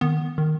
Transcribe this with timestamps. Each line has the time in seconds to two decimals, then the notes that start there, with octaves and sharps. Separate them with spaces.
0.01 D#3 B3
0.38 D#3